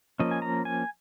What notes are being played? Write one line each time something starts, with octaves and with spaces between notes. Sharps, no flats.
F3 A#3 C#4 D#5
G#5
A#5
G#5